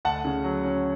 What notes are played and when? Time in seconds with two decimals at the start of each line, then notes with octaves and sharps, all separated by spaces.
0.05 D2 F#5 A5
0.25 C#3
0.44 F#3
0.64 C#4